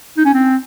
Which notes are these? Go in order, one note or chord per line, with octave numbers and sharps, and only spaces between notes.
D#4
C#4
C4